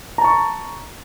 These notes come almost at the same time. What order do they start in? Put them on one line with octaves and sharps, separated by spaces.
A#5 A5 C#6